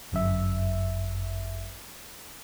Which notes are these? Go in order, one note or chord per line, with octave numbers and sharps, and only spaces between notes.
G1 F#2 E5